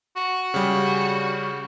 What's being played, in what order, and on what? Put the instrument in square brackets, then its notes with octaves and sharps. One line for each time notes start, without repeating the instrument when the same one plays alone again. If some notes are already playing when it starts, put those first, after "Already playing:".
[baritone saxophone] F#4
[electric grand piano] C#3 G3